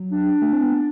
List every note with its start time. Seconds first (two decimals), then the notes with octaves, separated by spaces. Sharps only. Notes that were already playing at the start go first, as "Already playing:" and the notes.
Already playing: F#3
0.12 D4
0.41 A3
0.53 C4
0.62 B3